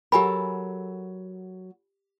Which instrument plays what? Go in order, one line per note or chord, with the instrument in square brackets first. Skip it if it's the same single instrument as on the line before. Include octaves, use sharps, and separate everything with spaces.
[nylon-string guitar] F#3 A4 A#4 [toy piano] G4 G#5 B5